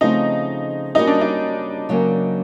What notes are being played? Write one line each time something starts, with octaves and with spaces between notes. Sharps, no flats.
C#3 F3 A3 C4 D#4 F4
G3 A#3 C#4 D#4 F#4
D4
D#4
C#3 F#3 A#3 C#4